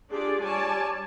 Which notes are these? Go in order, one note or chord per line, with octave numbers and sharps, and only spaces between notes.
D4 F4 G4 G#4 D5
G3 C#5 D5 G#5 A5